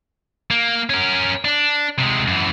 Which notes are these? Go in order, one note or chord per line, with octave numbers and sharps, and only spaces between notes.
A#3
C#4 A#4
D4
C3 G#3
F#2 E3